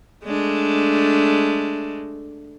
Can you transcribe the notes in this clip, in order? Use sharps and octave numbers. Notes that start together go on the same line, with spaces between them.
G#3 A3 D4